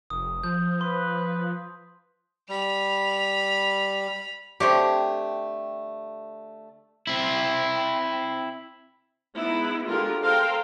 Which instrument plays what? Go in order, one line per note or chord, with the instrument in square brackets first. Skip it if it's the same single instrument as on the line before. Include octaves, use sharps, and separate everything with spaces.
[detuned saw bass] F1 [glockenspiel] D#6
[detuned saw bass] F3 [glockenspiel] G6
[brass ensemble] B4 [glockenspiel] C6
[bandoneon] G3 [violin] B5 F7
[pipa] D3 A3 C4 [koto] G4 C#5 G5
[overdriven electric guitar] C4 E4
[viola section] G#3 B3 D#4 E4
D3 G#3 B3 F4 G4 A#4
A4 A#4 C5 F5 G5